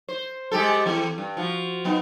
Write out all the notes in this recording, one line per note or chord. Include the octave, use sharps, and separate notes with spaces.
C5
G#3 G4 A4
E3 C4
G2
F3 F#4
F#3 B3 D#4